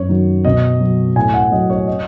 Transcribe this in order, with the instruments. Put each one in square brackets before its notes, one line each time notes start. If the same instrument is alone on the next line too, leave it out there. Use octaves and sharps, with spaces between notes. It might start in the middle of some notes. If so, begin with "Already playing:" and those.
Already playing: [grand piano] F#2 C#5
D#3 F#3
B2 D#5
F#3
A2 G#5
F#5
F#3 D#5
C#5
D#5